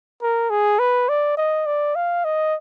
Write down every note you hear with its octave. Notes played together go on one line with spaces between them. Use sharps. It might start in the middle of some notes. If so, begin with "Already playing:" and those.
A#4
G#4
B4
D5
D#5
D5
F5
D#5